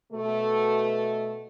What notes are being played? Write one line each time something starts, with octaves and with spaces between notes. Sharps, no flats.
B2 A3